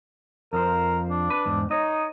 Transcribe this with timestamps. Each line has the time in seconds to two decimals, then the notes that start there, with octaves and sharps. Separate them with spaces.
0.53 F2 F3 A#4 C5
1.10 D4
1.30 B4
1.45 E2 G#2
1.71 D#4 C#5 D#5